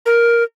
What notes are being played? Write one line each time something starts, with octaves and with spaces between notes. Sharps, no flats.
A#4